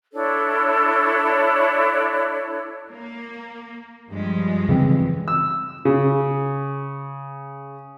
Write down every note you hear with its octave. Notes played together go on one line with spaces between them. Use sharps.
D4 E4 A4 C#5
A#3
G2 F3 G#3
C#3 E3 C4
E6
C#3